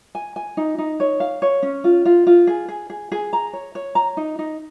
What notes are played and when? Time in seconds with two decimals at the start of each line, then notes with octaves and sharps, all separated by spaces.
0.15 G#5
0.36 G#5
0.57 D#4
0.78 D#4
1.00 C#5
1.20 F5
1.42 C#5
1.63 C#4
1.84 F4
2.05 F4
2.27 F4
2.47 G#4
2.69 G#4
2.90 G#4
3.12 G#4
3.33 A#5
3.53 C#5
3.75 C#5
3.95 A#5
4.17 D#4
4.39 D#4